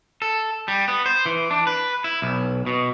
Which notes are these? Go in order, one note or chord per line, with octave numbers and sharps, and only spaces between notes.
A4
G3
B3
C5
E3
D4
B4
E4
B1
B2